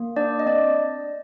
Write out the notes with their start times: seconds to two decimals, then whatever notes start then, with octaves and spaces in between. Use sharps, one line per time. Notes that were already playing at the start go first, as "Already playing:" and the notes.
Already playing: A#3
0.16 D4 D5
0.40 D#5
0.46 C4 D5